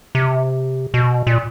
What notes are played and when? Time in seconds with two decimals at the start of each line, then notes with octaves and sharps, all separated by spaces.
0.15 C3
0.94 B2
1.27 A#2